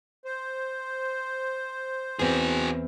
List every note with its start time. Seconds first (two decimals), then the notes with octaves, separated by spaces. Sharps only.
0.25 C5
2.19 E2 C4 F#4 G#4